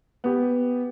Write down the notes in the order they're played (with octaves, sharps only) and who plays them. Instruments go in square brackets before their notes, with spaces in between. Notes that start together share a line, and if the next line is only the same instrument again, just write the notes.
[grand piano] B3 G4